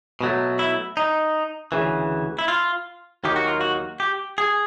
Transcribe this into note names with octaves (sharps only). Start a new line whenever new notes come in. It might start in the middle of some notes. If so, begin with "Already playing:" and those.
B2 F#3 A3
E4
D#4
D2 C#3 E3
E4
F4
D#2 D#3 F#3 A#3 D#4 G4
F#4
F4
F#4
G4
G#4